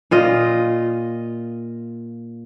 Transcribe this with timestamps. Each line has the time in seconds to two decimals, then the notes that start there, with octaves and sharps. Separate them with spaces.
0.11 A#2 F4 D#5